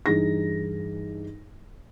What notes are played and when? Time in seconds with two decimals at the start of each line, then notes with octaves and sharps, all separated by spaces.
0.06 G2 E3 D#4 G#4 A#6